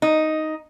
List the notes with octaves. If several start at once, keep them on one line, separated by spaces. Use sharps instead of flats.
D#4